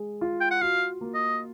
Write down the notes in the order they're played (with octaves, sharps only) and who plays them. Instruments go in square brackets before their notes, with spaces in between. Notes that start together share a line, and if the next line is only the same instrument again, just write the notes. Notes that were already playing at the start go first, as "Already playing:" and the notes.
Already playing: [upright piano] G#3
F4
[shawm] G5
F#5
[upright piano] F#4 [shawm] F5
[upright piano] A#3
[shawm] D#5